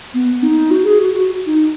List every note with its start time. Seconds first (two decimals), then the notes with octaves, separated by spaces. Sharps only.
0.14 B3
0.43 D#4
0.71 F#4
0.84 G#4
1.00 F#4
1.14 F#4
1.46 D#4